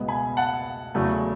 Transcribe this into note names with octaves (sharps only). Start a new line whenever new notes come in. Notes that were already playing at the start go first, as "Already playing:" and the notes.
Already playing: C#2 B2 G#3 B3
G#5 B5
F#5 A5
E2 C#3 F#3 A3